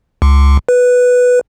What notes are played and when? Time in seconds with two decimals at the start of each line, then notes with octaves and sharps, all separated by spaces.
0.22 C#2
0.69 B4